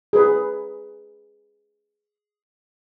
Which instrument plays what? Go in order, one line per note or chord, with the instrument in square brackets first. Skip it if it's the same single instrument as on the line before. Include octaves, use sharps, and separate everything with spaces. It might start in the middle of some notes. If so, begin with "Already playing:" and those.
[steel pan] G#4 B4